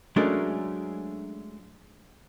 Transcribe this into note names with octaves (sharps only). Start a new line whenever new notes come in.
F#3 G#3 A3 C#4 D4 A#4